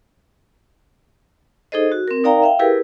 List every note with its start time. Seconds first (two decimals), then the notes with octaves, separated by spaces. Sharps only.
1.72 D#4 G#4 A4 C5 D#5
1.92 F#4
2.08 C4 A#4
2.24 D#4 A#4 D5 F5 G5 A#5
2.42 E5 F5 G5
2.59 E4 G4 G#4 A#4 B4